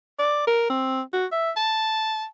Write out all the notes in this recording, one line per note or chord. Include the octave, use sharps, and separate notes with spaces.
D5
A#4
C4
F#4
E5
A5